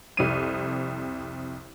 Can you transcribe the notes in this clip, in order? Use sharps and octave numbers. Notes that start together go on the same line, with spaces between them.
C2 F2 D#7